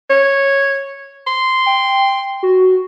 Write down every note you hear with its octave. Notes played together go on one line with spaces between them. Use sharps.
C#5
C6
G5
F#4